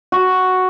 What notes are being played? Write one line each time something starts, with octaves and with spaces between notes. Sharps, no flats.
F#4